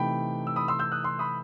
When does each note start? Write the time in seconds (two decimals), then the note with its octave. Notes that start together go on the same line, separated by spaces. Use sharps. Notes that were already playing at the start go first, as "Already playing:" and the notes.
Already playing: C3 E3 A3 D#4 G5 B5
0.47 E6
0.56 B5 D#6
0.68 C6 E6
0.79 E6 G6
0.92 D#6 F#6
1.04 C6 E6
1.19 B5 D#6